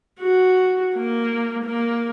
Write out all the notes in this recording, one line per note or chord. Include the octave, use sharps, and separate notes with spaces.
F#4
A#3
A#3